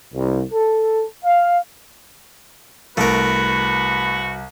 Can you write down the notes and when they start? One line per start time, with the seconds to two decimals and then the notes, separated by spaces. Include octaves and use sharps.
0.14 C2
0.53 A4
1.25 F5
2.97 C2 A3 F#4 A#4 B4